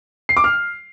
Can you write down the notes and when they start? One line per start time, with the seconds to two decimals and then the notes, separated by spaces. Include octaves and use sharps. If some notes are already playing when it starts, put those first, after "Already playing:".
0.29 C7
0.37 D6
0.44 F6